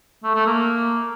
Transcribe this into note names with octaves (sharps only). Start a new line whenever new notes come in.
A3
A3
A#3